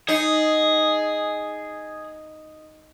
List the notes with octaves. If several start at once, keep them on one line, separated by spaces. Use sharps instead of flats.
D#4 G#4